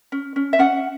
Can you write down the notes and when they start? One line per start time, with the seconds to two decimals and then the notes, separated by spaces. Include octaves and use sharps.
0.12 C#4
0.36 C#4
0.53 E5
0.59 C#4 F#5